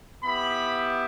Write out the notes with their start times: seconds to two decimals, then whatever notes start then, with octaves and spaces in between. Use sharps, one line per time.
0.23 B3 E4 G4 B5